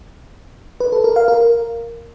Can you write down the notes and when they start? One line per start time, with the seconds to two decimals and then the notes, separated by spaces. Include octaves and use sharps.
0.80 B4
0.92 A4
1.04 A#4
1.16 F5
1.28 A#4